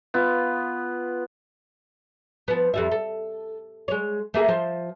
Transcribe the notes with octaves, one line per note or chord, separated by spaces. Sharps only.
B3 F4
F3 B3
F2 G3 E5
A4
G#3 C#5
A3 A#3 G#4
F3 C5